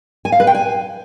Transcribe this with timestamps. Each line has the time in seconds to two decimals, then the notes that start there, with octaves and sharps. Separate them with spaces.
0.25 G#5
0.32 F5
0.40 B4
0.47 G5
0.55 G#5